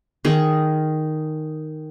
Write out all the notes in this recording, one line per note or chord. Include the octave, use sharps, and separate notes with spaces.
D#3 G#4